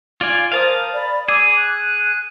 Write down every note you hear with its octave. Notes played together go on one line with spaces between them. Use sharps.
F4 D5 G#5
A#4 C5 F5 A5 D#6
D5 B5
G#4 D6 E6
F#6